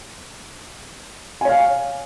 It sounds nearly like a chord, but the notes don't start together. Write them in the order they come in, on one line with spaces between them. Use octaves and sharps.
G#5 C#5 F5